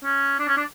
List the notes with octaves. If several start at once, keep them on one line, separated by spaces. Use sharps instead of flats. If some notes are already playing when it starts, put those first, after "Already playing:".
C#4
D4
C#4
D4